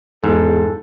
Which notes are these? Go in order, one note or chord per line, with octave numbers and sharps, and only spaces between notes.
E2 G#2 A4